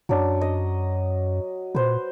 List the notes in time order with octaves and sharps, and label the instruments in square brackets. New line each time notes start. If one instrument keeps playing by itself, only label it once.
[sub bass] F#2 [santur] F#3 D4
[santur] D#5
[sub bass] A#2 [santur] B4 C5